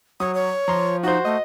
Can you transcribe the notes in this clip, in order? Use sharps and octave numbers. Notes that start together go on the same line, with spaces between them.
F#3 C#5 D#6
C#5
F3 A#5 C6
D#4 F#4 C5
A3 D#5